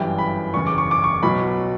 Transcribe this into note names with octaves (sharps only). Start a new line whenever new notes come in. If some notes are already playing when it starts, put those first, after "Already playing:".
Already playing: G1 F#2 E3 G3 G5
B5
F#1 E2 C#3 C#6
D6
C#6
D6
C#6
B1 B2 F#3 B5